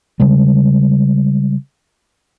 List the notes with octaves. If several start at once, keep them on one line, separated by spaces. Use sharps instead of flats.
C#3 G3 G#3